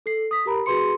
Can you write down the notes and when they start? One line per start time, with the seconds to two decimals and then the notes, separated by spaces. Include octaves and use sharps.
0.06 A4 C7
0.31 D#6 B6
0.46 G4 A#4 A#5 B5
0.66 F#4 G#4 B4 C6 C#7